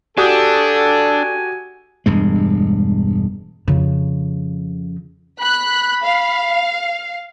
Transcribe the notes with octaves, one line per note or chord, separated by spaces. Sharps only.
D4 F#4 G4 A4 G#5 D#6
E1 G2 G#3
F2 C#3
B5 F#6 B6
F5